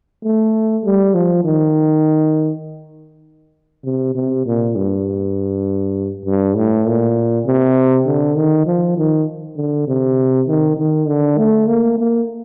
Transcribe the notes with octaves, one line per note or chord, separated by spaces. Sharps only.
A3
G3
F3
D#3
C3
C3
A#2
G2
G2
A2
A#2
C3
D3
D#3
F3
D#3
D3
C3
D#3
D#3
D3
A3
A#3
A#3